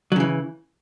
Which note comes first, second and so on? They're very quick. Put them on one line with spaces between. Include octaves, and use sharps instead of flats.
F#3 C#3 E3